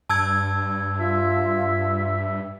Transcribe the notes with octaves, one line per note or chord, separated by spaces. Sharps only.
G2 A5 E6 G#6
F4 E5